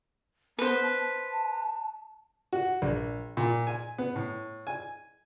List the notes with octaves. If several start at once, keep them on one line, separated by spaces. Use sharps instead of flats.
B3 B4 C5
A5
F#4
A#1
A#2
G#5
B3
A2
G#5